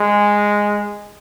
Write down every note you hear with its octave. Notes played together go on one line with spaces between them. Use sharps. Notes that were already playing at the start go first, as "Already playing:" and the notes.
Already playing: G#3